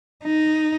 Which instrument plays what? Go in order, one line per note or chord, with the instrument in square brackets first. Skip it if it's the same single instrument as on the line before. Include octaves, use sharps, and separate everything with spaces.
[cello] D#4